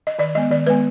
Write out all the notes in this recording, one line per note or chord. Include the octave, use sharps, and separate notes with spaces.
D#5
D#3 D5
G#3 B3 D#5
D#3 D5
G#3 B3 B4